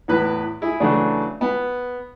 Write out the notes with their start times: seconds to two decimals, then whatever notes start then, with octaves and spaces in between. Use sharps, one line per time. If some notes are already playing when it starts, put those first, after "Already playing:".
0.08 E2 A2 B4
0.62 E4 G#4
0.80 C#3 E3 F#3 A3 D4
1.41 B3